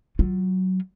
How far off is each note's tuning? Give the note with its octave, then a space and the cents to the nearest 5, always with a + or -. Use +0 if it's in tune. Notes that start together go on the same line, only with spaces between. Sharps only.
F#3 +15 F4 +15